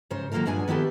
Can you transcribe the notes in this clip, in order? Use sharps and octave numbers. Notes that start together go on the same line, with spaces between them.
G#2 C#3 C5 C#5
D#3 F#3 A#3 F4 A4 A#4
G2 A#2 D4 G#4 F#5 G#5
D#3 B3 E4 G4 A4